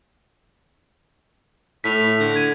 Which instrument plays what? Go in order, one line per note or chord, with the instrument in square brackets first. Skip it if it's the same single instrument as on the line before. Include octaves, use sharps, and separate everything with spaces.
[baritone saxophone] A2 [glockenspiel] B6 F7
[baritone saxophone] D3
[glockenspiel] G#6 D#7